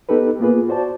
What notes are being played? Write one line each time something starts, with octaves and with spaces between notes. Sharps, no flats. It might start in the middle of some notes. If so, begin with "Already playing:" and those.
B3 D#4 G4 A4 B4
A#3 B3 F4 G#4 B4
F#4 C5 D5 A5